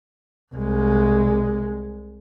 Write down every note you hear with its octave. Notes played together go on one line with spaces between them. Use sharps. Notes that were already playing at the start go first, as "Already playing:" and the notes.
C2 G#3